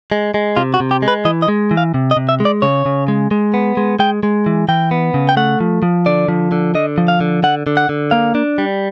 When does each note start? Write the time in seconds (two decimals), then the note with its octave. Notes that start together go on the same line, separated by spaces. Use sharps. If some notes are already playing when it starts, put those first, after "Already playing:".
0.12 G#3
0.34 G#3
0.56 C3 F4
0.74 F#4
0.80 C3
0.91 G4
1.02 G#3
1.08 B4
1.25 E3 D#5
1.42 D#5
1.48 G#3
1.71 E3
1.77 F5
1.94 C3
2.11 D#5
2.17 C3
2.29 E5
2.40 G#3
2.45 D5
2.62 C#3 C#5
2.86 C#3
3.08 G#3
3.31 G#3
3.54 B3
3.77 G#3
3.99 G#3 G5
4.23 G#3
4.46 E3
4.69 E3 G5
4.91 B3
5.14 C#3
5.29 G5
5.37 A3 F#5
5.60 F3
5.83 F3
6.06 D3 D5
6.28 F3
6.52 D3
6.75 D3 D#5
6.98 F3
7.08 F5
7.21 D3
7.43 D3 F#5
7.67 D3
7.77 F#5
7.89 D3
8.11 A#3 F5
8.35 D4
8.58 G3